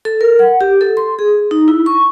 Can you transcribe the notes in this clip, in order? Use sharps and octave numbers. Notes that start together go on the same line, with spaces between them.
A4
A#4
F#5
G4
A4
C6
G#4
D#4
E4
C#6